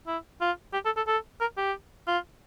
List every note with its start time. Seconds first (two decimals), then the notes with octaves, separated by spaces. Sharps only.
0.07 E4
0.41 F4
0.73 G4
0.85 A4
0.97 A4
1.07 A4
1.41 A#4
1.57 G4
2.08 F4